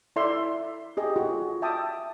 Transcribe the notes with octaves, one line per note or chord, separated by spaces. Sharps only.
E4 A4 D5 E5 C6
G4 G#4 D#5
F4 F#4 A4
E5 G5 A5 D6 D#6